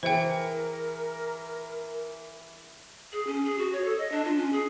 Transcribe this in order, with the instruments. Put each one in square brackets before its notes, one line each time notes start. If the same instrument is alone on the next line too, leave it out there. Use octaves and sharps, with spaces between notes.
[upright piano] E3 G#4 C#7 [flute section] A#4 [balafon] C5 G5
[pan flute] G#4
C#4
G#4
F#4
C#5
A4
D#5
D4
F4
C#4
G#4